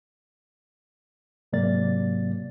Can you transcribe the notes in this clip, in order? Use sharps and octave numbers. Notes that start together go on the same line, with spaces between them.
G#2 C3 F#3 A#3 D5 A6